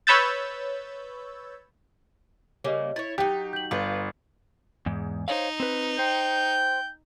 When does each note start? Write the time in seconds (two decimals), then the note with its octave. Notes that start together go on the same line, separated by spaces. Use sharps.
0.07 B4 C#5 B5 E6 G6 A6
2.64 C#3 G3 A#3 C#5 D#5
2.96 E4 C#5 A6
3.18 F#3 D#4 G4
3.53 G6 F#7
3.71 G1 F4 B4
4.86 E2 G#2
5.28 D#4 C5 C#5 F5
5.60 C4 B4
5.99 C5 G5 G6